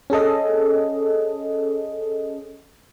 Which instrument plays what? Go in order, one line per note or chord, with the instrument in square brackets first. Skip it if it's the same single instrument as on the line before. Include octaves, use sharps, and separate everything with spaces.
[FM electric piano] C#4 G#4 A4 D#5